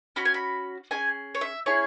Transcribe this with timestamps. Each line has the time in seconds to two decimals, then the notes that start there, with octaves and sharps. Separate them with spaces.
0.16 C#4 F#4 B5
0.25 G#5
0.34 B5
0.91 C#4 G#4 G#5
1.35 C#5
1.41 E5
1.66 C#4 E4 G#4 C#5